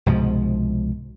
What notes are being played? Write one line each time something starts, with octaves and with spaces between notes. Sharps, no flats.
C2 G#2 B2 F3